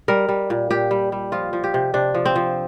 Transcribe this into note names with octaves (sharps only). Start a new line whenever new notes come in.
G3 A#4
G3
A#2
A#2 G4
G3
G3
F3 F4
F3
G4
C3
C3 D4
F3
C4
F3